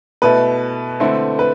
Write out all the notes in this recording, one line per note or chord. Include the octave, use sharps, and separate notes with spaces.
B2 A3 E4 B4
D3 A3 C4 E4
B4